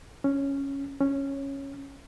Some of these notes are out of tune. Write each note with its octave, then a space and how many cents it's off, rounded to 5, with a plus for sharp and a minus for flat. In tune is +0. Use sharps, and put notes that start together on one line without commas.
C#4 -5
C#4 -10